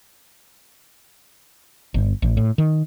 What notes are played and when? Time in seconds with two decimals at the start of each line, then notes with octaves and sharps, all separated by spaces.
1.94 G1
2.22 A1
2.37 A2
2.58 D#3